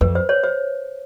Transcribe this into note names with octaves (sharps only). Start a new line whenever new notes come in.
F2 B4
C5
C#5
C5